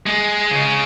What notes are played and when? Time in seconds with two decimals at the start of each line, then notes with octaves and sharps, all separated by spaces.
0.06 G#3
0.51 C#3